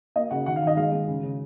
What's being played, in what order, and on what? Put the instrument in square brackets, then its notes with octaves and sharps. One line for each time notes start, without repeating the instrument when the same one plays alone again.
[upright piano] A#3 D#5
C#3 F#5
D#3 F#5
F5
D#3
D#5
G#3 F5
G#3
C#3
C#3